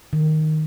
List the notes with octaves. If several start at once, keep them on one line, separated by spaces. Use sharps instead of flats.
D#3